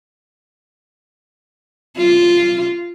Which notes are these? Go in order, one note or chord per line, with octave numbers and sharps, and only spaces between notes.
F4